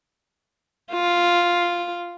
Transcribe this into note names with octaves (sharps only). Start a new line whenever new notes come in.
F4